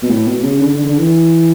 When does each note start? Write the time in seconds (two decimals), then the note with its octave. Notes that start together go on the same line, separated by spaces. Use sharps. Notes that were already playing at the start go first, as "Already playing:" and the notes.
0.03 B2
0.10 A2
0.27 B2
0.43 C#3
0.60 D3
0.73 D3
0.85 D3
0.98 E3